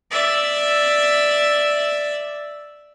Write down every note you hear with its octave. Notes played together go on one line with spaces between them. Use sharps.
D5 E5